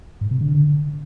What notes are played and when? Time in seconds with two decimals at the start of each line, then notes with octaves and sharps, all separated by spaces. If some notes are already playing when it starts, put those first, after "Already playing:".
0.21 G#2
0.31 C3
0.41 D3